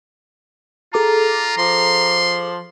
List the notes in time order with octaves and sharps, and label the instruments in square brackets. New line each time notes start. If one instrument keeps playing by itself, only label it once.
[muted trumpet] F4 [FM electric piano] G#4 A4 D6 [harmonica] A#5
[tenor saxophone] F3 [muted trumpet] C6